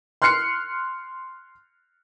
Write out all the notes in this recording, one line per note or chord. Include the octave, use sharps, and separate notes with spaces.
C6 F6 F#6 C7 C#7